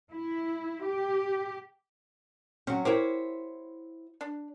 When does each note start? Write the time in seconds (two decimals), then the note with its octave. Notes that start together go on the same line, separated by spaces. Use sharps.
0.10 E4
0.84 G4
2.67 F#3 C4 C#4
2.85 E4 G4 A#4 C5 C#5
4.21 D4